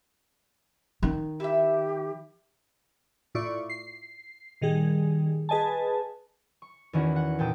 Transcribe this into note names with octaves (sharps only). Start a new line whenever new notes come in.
D#3
E4 G4 E5
A2 E4 F4 D5 C#6
C7
A#2 D#3 G3 G#4
G#4 B4 D#5 G#5 A5
C#6
E2 D#3 C#4 E4 F#4 F#5
F#5
E1 A#2 G5 A5 D#6 D7